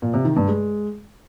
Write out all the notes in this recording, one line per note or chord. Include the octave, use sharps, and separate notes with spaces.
A#2
C3
D#3
G2
G#3